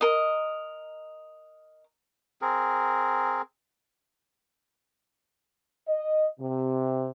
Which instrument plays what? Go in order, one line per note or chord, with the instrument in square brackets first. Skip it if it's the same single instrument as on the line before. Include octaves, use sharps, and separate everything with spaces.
[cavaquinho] A#4 D#5
[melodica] C4 G#4 A#4
[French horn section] D#5
C3